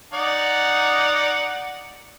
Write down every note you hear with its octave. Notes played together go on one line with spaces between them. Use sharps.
D#4 D5 F#5